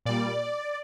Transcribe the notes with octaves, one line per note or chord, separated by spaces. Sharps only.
A#2 G3 D5